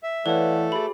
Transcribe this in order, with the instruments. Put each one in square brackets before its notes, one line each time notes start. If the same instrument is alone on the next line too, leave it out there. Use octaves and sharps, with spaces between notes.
[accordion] E5
[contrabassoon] E3 [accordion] A3 A4 [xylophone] B4 C#5 [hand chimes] D5 F5 F#5
[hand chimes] F#4 G#4 [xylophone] B5